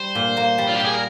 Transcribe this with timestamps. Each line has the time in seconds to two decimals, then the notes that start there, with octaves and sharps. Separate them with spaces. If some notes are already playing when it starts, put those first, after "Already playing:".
Already playing: G3 C5
0.15 A#2
0.37 A#3
0.58 G3
0.68 F4
0.76 G4
0.80 A#2
0.85 G#4
0.94 A#4